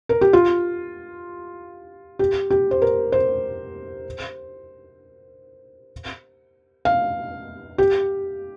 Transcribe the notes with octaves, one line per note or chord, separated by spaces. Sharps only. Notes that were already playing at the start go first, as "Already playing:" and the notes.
A#4
G4
F4
G4
G4
C5
A#4
C5
F5
G4